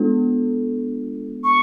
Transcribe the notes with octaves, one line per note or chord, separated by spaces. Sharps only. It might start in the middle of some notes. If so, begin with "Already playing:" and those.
Already playing: G#3 B3 D4 F4 A4
C#6